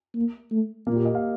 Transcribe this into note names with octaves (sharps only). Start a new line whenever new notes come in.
A#3
A3
A#2 A#3
G4
D#5
F5